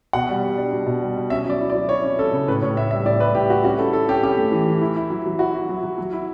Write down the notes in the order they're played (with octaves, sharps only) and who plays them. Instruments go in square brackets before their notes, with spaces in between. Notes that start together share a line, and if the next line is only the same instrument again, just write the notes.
[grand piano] B2 F#5
G3
G3
D4
B2
B2
G3
B2
C#4 E5
F#3 D5
E4
D5
F#3
E4 C#5
C#4
C#4 A4
C#3
A2 B4
A2 C#5
A2 E5
G3 E5
A2 D5
G3 B4
A2 G4
G3 F#4
C#4 F#4
E4 A4
E4 A4
C#4 G4
C#4 G4
A3
E3
E3
E4
E4
F#3
F#3
E4 F#4
E4
F#3
F#3
F#3
E4